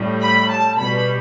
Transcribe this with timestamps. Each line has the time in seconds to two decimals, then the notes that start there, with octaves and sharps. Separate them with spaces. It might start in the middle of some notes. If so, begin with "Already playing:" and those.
Already playing: A2 G3
0.21 B5
0.50 A5
0.78 B2 G3 B5